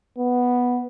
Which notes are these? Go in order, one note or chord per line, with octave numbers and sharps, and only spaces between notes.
B3